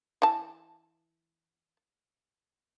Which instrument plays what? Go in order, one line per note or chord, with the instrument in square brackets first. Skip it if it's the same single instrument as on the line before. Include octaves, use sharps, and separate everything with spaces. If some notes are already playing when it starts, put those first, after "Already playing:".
[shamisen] E3 A5